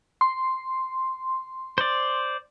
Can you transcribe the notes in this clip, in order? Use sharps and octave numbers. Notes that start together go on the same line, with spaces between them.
C6
C5 D5